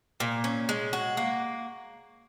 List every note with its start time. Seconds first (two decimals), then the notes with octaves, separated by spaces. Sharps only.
0.20 A#2
0.44 C#4
0.69 G#3
0.93 F#4
1.17 A#3